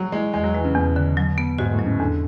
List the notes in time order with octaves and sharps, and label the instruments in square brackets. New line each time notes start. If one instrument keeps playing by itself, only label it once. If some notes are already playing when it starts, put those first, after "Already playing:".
Already playing: [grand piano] F#3 G#3
[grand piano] G#3 [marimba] E4
[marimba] E2 [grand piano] G#3
[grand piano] F#3
[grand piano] E3 [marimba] G#3
[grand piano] C#3
[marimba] E2 [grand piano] B2
[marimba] D3
F#3
B3
[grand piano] G#2 [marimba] F#4
[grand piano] A2
[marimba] F#3
[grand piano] C#3
[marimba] E2 [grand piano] D3